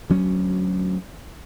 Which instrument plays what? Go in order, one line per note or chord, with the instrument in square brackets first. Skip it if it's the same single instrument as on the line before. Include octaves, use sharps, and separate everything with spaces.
[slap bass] D2 F#3 C#4